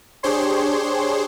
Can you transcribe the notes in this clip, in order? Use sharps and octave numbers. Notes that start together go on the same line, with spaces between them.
D4 G4 G#4 C5 C#5 C6